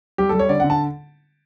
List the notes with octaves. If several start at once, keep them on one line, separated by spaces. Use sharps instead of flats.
G3 G4
G3 A4
C#5
D3 D5
D3 F#5
A5